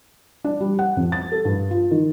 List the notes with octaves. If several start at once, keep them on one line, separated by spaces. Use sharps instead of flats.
D4
G3
F#5
F2
A6
A4
G2
F4
D#3